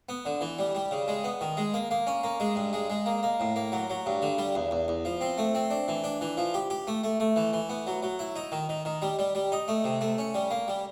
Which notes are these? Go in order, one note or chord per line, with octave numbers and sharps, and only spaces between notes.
B3
D3
E3
G3
G3
C#3
G#3
B3
D#3
G#3
A#3
A#3
C#4
A#3
G#3
G2
G#3
G#3
A#3
A#3
A2
A#3
F#3
F#3
G2
D3
G3
E2
E2
E2
F3
C4
A3
C4
D4
E3
D4
E3
F3
G4
G4
A3
A3
A3
E3
E3
B3
F#3
F#3
E4
D#4
D#3
D#3
D#3
G3
G3
G3
D#4
A3
C3
A3
C#4
G3
A#3
G3